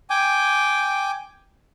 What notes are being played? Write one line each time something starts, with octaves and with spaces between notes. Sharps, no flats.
G5 G#5 D6